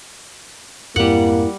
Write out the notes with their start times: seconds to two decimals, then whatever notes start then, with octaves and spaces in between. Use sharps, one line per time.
0.96 F2 G#2 G3 A#3 C4 E4 F#5